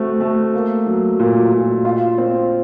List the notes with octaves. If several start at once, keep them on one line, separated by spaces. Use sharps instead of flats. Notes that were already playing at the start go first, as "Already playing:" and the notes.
Already playing: A3 C4 F#4
A3
A#3
F#3
A#2
A#2
F4
C4